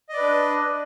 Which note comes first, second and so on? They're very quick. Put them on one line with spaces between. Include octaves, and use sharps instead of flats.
D#5 D5 B4 D4